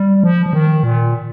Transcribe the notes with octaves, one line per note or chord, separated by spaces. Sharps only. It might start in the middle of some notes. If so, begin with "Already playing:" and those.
Already playing: G3
F3
F3
D#3
A#2